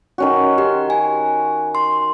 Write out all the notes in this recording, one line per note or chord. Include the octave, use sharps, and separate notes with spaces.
D#3 C#4 F#4
G4 C6
G#5
C6